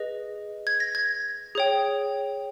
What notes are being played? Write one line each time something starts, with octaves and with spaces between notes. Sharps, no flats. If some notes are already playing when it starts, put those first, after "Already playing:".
Already playing: G#4 B4 D#5
G#6
A#6
G#6
G#4 C#5 G5